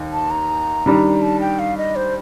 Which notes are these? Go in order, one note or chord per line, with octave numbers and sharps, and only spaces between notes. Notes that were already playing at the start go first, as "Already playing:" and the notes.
Already playing: D#2 D#4
A5
A#5
D#3 G3 D4
A5
G5
F5
D#5
C5